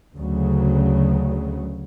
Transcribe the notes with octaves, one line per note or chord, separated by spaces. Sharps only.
D2 C#3 F#3